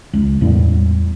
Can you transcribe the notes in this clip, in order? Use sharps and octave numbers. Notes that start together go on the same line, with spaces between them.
C#2
E2 A2 G3